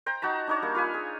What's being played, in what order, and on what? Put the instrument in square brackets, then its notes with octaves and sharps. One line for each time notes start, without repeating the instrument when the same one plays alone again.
[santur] C5 G5 A#5
D#4 F#4 A5 A#5
D4 D#4 C#5
G3 A#3
F4 B4 G#5
G#4